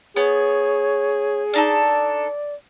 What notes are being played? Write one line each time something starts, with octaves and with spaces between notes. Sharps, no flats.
B3 G#4 C#5
D4 D#4 A4 D5